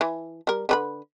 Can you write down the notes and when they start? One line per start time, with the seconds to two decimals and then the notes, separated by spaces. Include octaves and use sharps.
0.01 E3
0.47 G3 A#4
0.69 D3 B4 B5